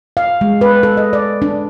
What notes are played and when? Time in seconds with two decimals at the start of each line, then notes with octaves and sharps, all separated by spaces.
0.17 F5
0.41 G#3
0.61 B4
0.83 A4
0.97 D#5
1.13 D5
1.42 D4